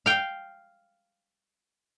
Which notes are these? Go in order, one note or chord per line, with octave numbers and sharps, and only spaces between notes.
F5 G5